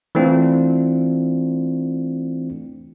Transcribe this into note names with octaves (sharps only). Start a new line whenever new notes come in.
E3 A3 C4 D4 F4